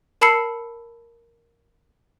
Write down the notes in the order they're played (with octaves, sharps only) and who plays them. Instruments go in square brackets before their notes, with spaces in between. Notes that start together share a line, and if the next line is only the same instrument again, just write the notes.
[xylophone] A#4 A5 B5 E6 C7 C#7